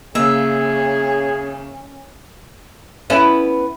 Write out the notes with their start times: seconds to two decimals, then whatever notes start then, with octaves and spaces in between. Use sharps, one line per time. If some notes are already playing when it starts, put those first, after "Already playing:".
0.15 C#3 A#3 C#4 G#4 E5
3.10 B3 C#4 E4